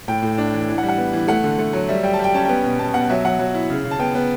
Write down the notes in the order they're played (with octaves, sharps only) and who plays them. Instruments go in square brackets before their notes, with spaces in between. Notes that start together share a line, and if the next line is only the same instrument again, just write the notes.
[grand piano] A2 G5
A2
D4
E3
E3
F#5
G3
F#5
B3
E3
A3 F#5
D3
A3
F#3
G3 E5
G3 G5
A5
G3 G5
C#4 A5
B3 G5
B2
B2 A5
B2 F#5
F#3 E5
F#3 F#5
F#3
E4
C#3
C#3
A5
B3 G5
B3